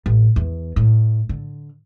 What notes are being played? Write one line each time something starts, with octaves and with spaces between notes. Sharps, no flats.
A1
E2
A2
D3